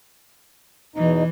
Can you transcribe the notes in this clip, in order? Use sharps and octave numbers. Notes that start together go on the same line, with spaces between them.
E2 B2 E3 D#4